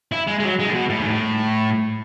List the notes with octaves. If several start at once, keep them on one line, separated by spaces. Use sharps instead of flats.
E4
G#3
G#3
F#3
G#3
A2
B2
A2
G#2
A2